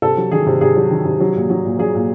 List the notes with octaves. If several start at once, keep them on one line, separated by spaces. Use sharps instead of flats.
C3 A4
F#3
D#3 G#4
C3
C3 G#4
F#3
D#3
C3
F#3
A#2
F#3
A#2
F#3 G#4
A#2